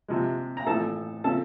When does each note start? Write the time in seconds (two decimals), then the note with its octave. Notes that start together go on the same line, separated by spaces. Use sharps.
0.08 C3 F3 G#3
0.57 A#5
0.67 A1 A2 F3 A3 A4 A5
1.24 C#3 F3 A4 A5